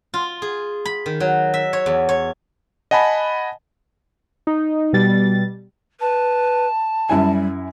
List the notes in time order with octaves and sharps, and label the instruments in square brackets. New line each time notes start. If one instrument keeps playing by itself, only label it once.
[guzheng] F4
G#4
B5
D#3
F#3
E5
C#5
E2
C#5
[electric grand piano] D#5 F#5 G#5 A5 B5
[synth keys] D#4
B2 G3 A6
[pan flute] B4 [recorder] A5
[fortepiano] F#2 E4 G#5 [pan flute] G3